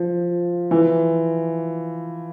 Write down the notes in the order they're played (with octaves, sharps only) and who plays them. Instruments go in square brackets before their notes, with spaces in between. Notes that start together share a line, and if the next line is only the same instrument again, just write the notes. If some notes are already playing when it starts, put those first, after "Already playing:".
Already playing: [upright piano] F3
E3